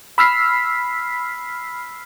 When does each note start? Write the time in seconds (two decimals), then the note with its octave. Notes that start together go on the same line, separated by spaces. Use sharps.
0.18 B5 E6 F6 B6 C7